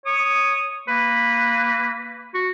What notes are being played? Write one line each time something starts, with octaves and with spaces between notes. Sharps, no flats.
C#5 D#6
A#3 B4
F#4